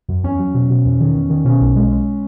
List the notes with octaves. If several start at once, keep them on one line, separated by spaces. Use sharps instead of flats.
F#2
E2 C#4
F#3
B2
B2
E2
D#3
E2
D#3
B2 C#4
B1
G#3
G#3